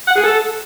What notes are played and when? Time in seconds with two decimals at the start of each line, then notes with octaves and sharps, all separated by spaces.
0.08 F#5
0.16 G#4
0.24 A4